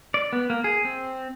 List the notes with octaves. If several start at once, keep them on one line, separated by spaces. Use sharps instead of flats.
D5
B3
A#3
G#4
C4